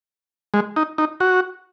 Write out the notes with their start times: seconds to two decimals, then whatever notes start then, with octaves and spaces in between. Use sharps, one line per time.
0.54 G#3
0.76 D#4
0.98 D#4
1.20 F#4